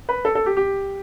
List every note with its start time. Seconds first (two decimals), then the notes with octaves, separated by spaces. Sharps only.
0.09 B4
0.25 A4
0.35 A4
0.46 G4
0.57 G4